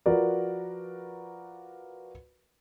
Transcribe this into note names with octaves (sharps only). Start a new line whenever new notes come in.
F3 F#4 A#4 B4 D5